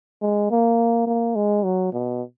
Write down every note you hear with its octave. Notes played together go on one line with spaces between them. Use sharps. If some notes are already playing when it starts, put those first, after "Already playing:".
G#3
A#3
A#3
G#3
F#3
B2